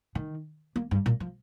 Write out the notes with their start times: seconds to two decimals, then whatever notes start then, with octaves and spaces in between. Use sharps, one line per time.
0.15 D#3
0.76 A#3
0.91 G2
1.06 A#2
1.20 F3